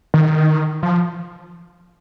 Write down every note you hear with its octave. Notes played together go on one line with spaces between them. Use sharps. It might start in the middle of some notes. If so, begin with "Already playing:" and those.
D#3
F3